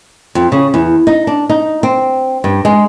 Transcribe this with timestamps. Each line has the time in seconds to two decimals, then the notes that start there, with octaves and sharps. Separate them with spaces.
0.35 F2
0.52 C#3
0.74 E2
1.07 D#4
1.27 D4
1.50 D#4
1.83 C4
2.44 G2
2.65 G#3